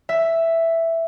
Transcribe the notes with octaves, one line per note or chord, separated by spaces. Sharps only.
E5